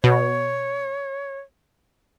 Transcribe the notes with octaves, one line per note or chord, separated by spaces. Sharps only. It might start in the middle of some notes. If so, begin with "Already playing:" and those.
B2 C#5